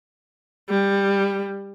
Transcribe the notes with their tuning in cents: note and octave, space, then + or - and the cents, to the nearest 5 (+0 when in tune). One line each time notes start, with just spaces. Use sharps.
G3 +15